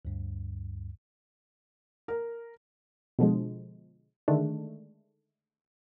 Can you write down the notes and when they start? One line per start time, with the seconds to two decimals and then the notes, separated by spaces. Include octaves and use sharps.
0.05 D2 G2
2.08 A#4
3.19 B2 D3 F3 G#3
4.28 D3 D#3 G#3 A3 D4